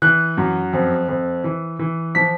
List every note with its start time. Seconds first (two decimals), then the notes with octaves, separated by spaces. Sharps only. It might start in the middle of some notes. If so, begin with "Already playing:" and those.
0.02 E3 F#6
0.37 F#2
0.73 F2
1.08 F2
1.44 E3
1.79 E3
2.15 F3 B6